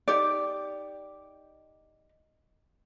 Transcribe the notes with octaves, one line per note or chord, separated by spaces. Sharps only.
D#4 G4 D5